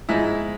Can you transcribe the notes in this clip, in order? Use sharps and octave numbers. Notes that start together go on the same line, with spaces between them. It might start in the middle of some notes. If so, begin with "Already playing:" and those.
G#2 F3 G#3 E4